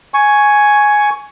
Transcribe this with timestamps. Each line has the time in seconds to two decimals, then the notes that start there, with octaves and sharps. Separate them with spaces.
0.14 G#5 C#6